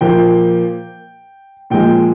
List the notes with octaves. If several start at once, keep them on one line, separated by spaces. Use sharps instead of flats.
A#2 F3 A#3 G5
A#2 F3 G#3 G5